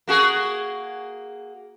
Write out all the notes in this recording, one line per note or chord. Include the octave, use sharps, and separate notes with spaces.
A#3 F#4 G#4